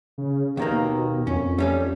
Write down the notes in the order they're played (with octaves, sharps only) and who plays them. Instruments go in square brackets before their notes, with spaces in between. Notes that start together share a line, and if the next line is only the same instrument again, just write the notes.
[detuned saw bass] C#3
[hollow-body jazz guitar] D#2 D#3 A#3 [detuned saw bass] B2
[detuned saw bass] F2 [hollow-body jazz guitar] C#4
[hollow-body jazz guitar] G3 C#4 A4